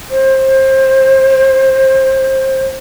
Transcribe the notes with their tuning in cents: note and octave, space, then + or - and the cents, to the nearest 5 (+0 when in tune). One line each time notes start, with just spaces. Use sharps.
C5 +25